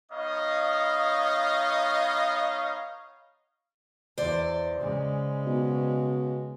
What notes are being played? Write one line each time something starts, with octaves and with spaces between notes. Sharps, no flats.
B3 D#4 C#5 D#5 F5
E2 C5 D5
C#3 G#3
B2